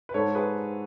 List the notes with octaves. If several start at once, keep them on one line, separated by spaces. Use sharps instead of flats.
B4
G#2 A4 C#5
G#4 B4